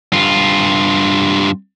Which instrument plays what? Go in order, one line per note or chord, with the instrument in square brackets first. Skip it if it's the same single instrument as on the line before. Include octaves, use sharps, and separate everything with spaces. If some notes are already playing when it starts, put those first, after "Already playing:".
[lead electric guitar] G2 F4